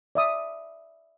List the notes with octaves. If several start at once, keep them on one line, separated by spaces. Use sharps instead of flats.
D5 E5 D#6